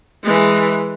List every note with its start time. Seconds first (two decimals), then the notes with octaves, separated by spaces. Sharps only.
0.24 E3 G#3